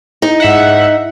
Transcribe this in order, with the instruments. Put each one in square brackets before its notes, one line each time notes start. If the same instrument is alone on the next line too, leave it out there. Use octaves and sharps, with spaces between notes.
[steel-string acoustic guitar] D#4
[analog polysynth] G#2 E5 F#5